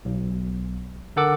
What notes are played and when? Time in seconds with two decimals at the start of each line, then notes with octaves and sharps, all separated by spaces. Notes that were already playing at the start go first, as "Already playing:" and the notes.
0.05 B1
1.16 D3 A4 A#4 F#5 D6 E6